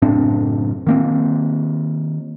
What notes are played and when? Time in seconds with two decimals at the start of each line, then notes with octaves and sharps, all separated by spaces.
0.02 F#1 A2 C4 D4
0.87 D#3 A#3 C4